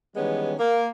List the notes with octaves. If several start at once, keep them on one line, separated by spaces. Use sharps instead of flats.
D#3 E3 G3 G#3 B3 C#4
A#3